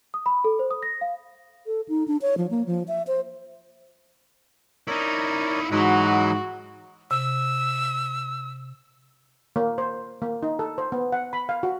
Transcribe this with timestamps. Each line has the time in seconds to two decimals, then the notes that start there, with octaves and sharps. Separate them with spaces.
0.14 D#6
0.26 B5
0.44 A4
0.59 C5
0.71 D#6
0.83 A#6
1.01 F5
1.65 A4
1.89 D#4
2.08 D4
2.22 C#5
2.38 F3
2.50 A#3
2.66 F3
2.88 E5
3.07 C5
4.87 D#4 E4 A#4 C#5 D5
5.72 G#2 E3 F#3 E4 F#4 D#5 F#5
7.11 C3 E6
9.56 A#3
9.78 C5
10.22 A#3
10.43 D#4
10.59 A4
10.78 C5
10.92 B3
11.12 F#5
11.33 B5
11.49 F5
11.63 F#4